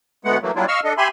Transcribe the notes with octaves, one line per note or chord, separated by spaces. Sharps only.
D2 G#3 A3 B3 F#5
E3 F#3 A3 A#3
F#3 G3 A#3 D4 E4 F4
D#5 F5 C#6 E6 F6
D4 A4 D#5
G4 E5 G#5 B5 C6